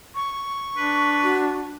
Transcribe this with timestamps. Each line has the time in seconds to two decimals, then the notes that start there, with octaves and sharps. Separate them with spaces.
0.15 C#6
0.77 D4 B4
1.24 F#4